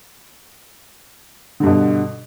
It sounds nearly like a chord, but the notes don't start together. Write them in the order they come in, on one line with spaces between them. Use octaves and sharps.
D3 G2 B2